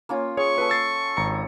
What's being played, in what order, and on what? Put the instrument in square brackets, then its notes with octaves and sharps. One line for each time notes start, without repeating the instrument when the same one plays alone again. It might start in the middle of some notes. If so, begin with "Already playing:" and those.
[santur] A#3 C#4 F4
[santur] G#4 [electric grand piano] C#5 [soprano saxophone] C#6
[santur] F4 A4 [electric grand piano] B4 C#5
[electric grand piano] E6 A6 C7
G#1 A#5 C#7